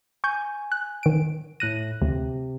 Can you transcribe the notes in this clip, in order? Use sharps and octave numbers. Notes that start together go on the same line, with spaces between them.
G#5 C#6 G6
F#6
D#3 D7
A2 F#6 A#6 D#7
D2 C3